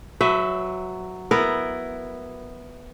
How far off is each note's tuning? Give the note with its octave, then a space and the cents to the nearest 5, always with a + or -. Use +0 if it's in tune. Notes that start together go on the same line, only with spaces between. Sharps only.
F#3 +0 B4 +30 E5 +0
B3 +0 E4 +5 A#4 -5